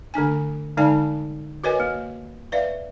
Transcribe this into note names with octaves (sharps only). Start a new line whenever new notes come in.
D3 A3 D4 G#5
D3 G#3 D#4 D5 G#5 A5
F#4 A#4 B4 C#5 D#5 G#5
A#3
B4 D5 E5 F5